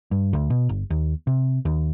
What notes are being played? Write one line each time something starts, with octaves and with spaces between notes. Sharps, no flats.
G2
D2
B2
G1
D#2
C3
D#2